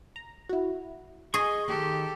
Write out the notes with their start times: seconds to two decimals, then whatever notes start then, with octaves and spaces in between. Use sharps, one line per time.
0.16 A#5
0.49 E4 F#4
1.34 G#4 D#5 G#5 C#6
1.68 D#3 G4 A4 F#6